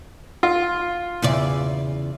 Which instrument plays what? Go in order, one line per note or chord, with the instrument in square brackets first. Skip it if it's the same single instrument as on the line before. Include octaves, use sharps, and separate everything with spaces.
[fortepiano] F4
[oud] E2 C#3 D5